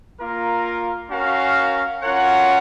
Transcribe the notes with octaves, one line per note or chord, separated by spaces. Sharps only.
A#3 F4 A#4
C#4 F#4 A#4 F5
C#4 F4 A#4 C#5 F#5